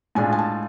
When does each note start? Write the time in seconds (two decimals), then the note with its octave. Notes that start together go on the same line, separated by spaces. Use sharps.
0.15 A2 G#3 D4 F4 G#5
0.32 G#5
0.38 A5